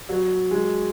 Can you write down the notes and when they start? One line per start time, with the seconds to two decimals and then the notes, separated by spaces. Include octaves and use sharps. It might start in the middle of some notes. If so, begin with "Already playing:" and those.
0.09 F#3
0.51 G#3